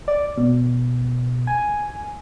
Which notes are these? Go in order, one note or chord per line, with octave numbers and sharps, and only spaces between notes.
D5
B2
G#5